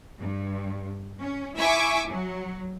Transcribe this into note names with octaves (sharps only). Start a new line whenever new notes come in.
G2
C#4
E4 E5 G#5 C#6 D6
F#3